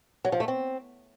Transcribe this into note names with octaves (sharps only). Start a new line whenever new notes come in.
F#3
F3
A3
C4